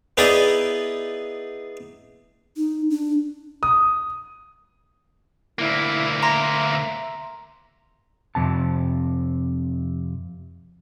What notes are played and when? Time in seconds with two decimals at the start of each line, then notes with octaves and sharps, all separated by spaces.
0.17 B3 D#4 E4 G#4 D5 B5
2.57 D#4
2.90 D4
3.63 D#6
5.59 D2 A#3 E4
6.23 E5 A#5 C6 A#6
8.35 F2 C3 A5